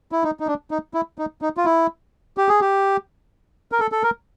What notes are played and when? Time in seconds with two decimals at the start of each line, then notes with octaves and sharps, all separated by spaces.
0.12 E4
0.24 D#4
0.40 D#4
0.47 D4
0.71 D#4
0.94 E4
1.18 D#4
1.42 D#4
1.57 F4
1.65 E4
2.37 G4
2.49 G#4
2.61 G4
3.72 A#4
3.80 A4
3.92 A4
4.03 A#4